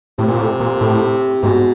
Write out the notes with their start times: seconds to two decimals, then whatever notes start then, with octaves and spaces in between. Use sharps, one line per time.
0.18 A2 C3
0.28 A#2
0.39 A2
0.60 A#2
0.81 A2
1.43 G#2 B2